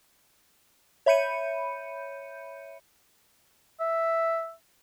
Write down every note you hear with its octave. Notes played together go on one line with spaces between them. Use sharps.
C#5 E5 B5 G6 C#7 D#7
E5